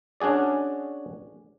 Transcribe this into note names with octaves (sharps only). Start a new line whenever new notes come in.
C#4 D4 F#4 G#4 D5